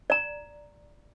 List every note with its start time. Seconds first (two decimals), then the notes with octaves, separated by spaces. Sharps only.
0.10 D5 A#5